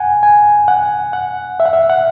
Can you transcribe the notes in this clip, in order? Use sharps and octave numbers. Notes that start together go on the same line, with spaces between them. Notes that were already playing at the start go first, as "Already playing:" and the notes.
Already playing: F#5 G#5
G#5
F#5
F#5
E5
F#5
E5
F#5